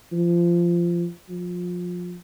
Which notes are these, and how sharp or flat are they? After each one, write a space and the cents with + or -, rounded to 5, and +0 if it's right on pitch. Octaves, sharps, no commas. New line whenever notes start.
F3 -20
F3 +25